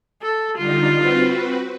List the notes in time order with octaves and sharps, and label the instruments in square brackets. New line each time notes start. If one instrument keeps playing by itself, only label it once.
[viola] A4
[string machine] D3 G3 D#4 [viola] F4
[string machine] C4 F#4 B4